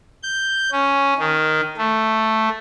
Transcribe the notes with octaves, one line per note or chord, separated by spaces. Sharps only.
G6
C#4
D#3
A3